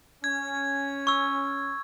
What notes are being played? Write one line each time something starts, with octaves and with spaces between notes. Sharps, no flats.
C#4 G#6
C#6 E6